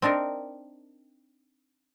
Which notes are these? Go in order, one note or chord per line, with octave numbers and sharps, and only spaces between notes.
C4 D4 D#4 A#4